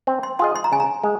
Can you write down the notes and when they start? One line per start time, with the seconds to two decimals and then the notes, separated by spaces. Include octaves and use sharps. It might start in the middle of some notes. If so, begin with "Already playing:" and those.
0.07 C4
0.23 C6
0.39 F4 G#4 D#5 C6
0.56 C6
0.64 A#5
0.72 C#3 G#5
0.80 A#5
1.04 G#3